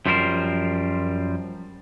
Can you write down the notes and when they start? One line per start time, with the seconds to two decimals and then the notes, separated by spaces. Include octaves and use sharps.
0.06 F#2 F3 G3 C#4 A#4 C5